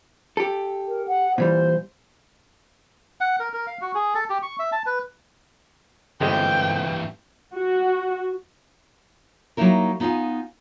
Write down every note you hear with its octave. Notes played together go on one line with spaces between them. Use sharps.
G4 A4
A#4
F#5
A#2 E3 G3 C5
F#5
A#4
A#4
F5
F#4
G#4
A4
G4
C#6
E5
A5
B4
G1 G2 C3 E3 G#3 G5
F#4
F#3 G3 A#3 D#4 E4 A#4
B3 D#4 F4 D5 F5 G#5